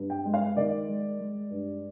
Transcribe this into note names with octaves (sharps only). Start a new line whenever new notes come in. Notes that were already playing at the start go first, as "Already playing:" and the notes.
Already playing: G2
G5
G#3
F5
D#3 D5
G#3
G#3
G2